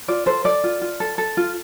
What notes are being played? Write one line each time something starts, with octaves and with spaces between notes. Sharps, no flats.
F4 D5
A4 C5
A4 D5
F4
F4
A4
A4
F4